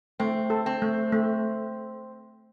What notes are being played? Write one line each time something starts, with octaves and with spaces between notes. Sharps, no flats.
A3 C4
A4
C4
A3
A3